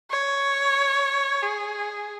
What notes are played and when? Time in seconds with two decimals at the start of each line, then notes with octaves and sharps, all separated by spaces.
0.11 C#5
1.42 G#4